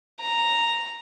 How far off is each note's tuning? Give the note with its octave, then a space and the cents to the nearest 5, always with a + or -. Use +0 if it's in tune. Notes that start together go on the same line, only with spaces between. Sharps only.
A#5 -5